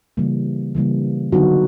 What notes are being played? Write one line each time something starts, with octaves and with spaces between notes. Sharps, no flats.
C#3 E3 G3 A#3
C#3 E3 G3 A#3
D3 F#3 B3 D#4 F#4